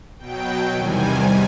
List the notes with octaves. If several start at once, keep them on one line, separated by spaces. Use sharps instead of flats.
B2 F#3 G5
E2 C3 D#3 G3 G#5